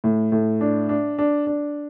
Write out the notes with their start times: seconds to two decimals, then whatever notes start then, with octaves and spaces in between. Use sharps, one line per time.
0.04 A2
0.32 A2
0.61 D4
0.89 D4
1.19 D4
1.47 D4